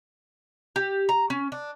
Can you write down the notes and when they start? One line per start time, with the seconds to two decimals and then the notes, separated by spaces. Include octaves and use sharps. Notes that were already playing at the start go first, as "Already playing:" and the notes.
0.76 G4
1.09 A#5
1.30 C#4
1.52 D4